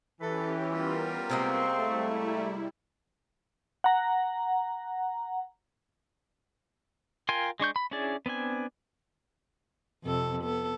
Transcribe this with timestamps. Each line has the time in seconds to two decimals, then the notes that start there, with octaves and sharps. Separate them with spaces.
0.21 E3 C#4 G4 A4 B4
0.71 G3 B3 F4 A#4
1.30 C3 G#3 A#3 C4 C6 C#6
1.78 G3 A3 E4
3.84 F#5 A#5
7.29 F4 A#4 G5 G#5 C6
7.60 G#3 D4 C#6 G6
7.76 B5
7.91 C#4 D4 E4 G#4 D5
8.26 B3 C4 D4 G#5
10.04 F2 C3 A4
10.43 B3 A4